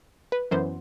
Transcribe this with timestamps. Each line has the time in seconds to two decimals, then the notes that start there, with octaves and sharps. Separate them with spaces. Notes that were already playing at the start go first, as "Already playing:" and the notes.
0.32 B4
0.51 F#2 E3 B3 C5